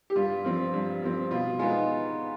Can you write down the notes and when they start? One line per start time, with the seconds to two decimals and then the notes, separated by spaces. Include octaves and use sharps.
0.10 G4
0.16 G2 F4
0.44 F3 C4
0.74 G2
1.02 F3 C4
1.31 B2 F4
1.59 G#3 B3 D#4 F4